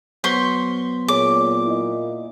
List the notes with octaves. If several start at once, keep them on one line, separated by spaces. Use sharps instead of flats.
F#3 B3 C5 C6 C#6 B6
A#2 G#4 C#5 D6
E4 D#5